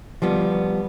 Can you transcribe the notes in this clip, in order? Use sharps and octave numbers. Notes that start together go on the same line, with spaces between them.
F3 G3 B3